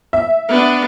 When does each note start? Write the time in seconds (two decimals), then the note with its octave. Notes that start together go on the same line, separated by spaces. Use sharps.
0.13 E5
0.49 B3 D4